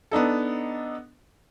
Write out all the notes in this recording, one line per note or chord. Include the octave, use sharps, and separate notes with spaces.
B3 D4 D#4 A4